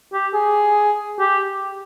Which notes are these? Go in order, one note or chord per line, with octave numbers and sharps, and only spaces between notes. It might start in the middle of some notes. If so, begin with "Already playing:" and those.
G4
G#4
G4